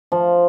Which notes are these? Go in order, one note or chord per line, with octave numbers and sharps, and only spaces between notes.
F3